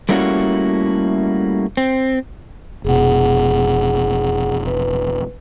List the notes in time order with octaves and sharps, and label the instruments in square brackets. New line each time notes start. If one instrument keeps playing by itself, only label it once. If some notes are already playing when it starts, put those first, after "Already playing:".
[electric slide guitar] G3 A3 A#3 C#4 E4 F#4
C4
[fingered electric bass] F1 B2 [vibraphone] G#4 F#5
[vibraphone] B4